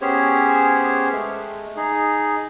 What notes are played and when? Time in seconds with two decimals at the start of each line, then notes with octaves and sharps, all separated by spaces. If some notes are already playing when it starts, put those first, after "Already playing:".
0.01 B3 C#4 G4 G#4 C5 C#5
1.12 G#3 A3
1.76 D#4 G#4